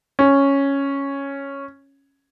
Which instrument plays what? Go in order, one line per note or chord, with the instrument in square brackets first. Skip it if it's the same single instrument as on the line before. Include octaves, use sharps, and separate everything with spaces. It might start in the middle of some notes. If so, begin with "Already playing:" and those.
[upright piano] C#4